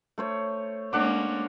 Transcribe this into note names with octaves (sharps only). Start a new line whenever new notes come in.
A3 C5 C#5
G#3 A#3 C#4 D4 F#5 D6